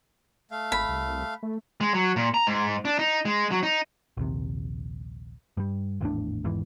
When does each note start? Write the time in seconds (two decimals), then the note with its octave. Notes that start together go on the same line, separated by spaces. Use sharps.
0.51 A3 F5
0.72 G#1 B5
0.89 C2
1.43 A3
1.81 G#3
1.94 F#3
2.16 A#2
2.34 A#5
2.47 G#2
2.85 D4
2.99 D#4
3.25 G#3
3.51 F#3
3.63 D#4
4.17 A#1 D#2 C3
5.57 G2 G3
6.01 G#1 E2 A2 D4
6.44 G#1 E2 G#2 E3